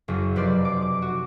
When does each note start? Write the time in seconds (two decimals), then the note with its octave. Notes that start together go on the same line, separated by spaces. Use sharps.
0.08 F#1 F#2
0.36 F1 B4 C5 D5
0.65 D6
0.82 D6
1.02 F#4